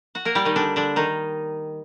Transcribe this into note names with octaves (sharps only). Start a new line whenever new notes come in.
F#4 F#5
A#3 A#4
G3 G4
D#3 D#4
D3 D4
D3 D4
D#3 D#4